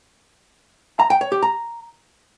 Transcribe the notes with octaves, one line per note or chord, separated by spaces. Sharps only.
A#5
G5
C#5
G4
A#5